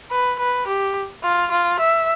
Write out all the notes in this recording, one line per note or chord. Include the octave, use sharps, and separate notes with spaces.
B4
B4
G4
F4
F4
E5